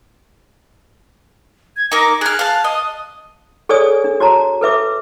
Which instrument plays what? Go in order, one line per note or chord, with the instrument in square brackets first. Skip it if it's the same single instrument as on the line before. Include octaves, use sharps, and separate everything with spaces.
[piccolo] G#6
[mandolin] D#4 A#4 [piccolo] D6
[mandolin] G#4 F6 [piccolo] F#6
[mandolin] F5 A5
[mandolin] D#5 [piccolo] D#6
[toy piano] G#4 A4 C#5 D5 G#5 D#6
D4
F#4 C#5 A5 A#5
A4 B4 E5 D6